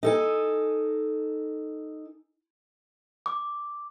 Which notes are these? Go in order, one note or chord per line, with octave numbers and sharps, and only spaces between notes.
D#4 A4 G#5
D6